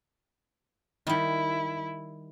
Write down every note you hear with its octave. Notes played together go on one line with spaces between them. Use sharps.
D#3 G3 E4